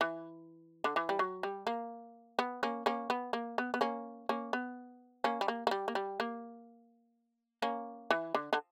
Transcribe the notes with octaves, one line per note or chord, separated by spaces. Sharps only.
E3
D3
E3
G3
F#3
G3
A#3
B3
A#3 C#4
A#3 C#4
B3
A#3
B3
B3
A#3 C#4
A#3 C#4
B3
A#3 C#4
G3
A#3
A#3
G3
A#3
G3
A#3
A#3 C#4
E3
D3
D3